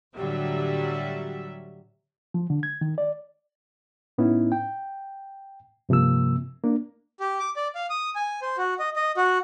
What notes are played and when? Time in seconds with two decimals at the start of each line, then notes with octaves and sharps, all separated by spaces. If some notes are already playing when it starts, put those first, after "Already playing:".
0.16 A2 D3 F#3 G3 E5
2.34 F3
2.50 D3
2.63 G#6
2.81 D#3
2.98 D5
4.18 A2 B3 C#4 D#4 E4
4.52 G5
5.89 G2 C3 F3 A#3 E6
6.64 A#3 D4
7.20 G4
7.39 D6
7.56 D5
7.75 F5
7.90 D#6
8.16 G#5
8.42 C5
8.58 F#4
8.79 D#5
8.96 D#5
9.17 F#4